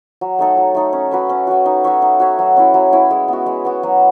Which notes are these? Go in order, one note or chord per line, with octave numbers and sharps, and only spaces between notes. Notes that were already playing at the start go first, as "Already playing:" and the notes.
F#3
A3 D#4 A4
F#3
A3 D#4 A4
C#4
F#4 B4 E5
C#4
F#4 B4 E5
D#4
F#4 C#5 E5
D#4
F#4 C#5 E5
F#3
C#4 E4
F#3
C#4 E4
G#3
B3 F#4
G#3
B3 F#4
F#3